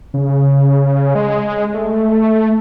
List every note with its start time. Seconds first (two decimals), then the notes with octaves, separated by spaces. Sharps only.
0.14 C#3
1.15 G#3
1.74 A3